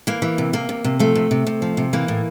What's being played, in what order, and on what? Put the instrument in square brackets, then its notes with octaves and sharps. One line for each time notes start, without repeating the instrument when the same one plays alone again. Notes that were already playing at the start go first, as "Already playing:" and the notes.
[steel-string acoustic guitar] E3 A#3
E3
C3
C3 A#3
C3
C3
F3 A3
C3
C3
C3
F3
C3
E3 A#3
A2